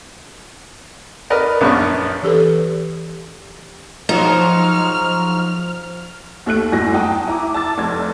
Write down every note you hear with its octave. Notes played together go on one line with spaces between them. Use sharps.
A#4 B4 D5 D#5
A#1 F#2 B3 C#4 C#6
E3 G4 A4 B4
G#2 F3 F#3 D#4 F6
D#2 A3 F#6 D7
G1 F#2 A2 G#5 A#6
F#5 G5 A5 A#5 D#6
E4 A#5 D6
A5 E6 A6
F1 G#6